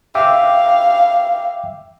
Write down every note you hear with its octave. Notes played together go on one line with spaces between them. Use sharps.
E5 F5 G5 D6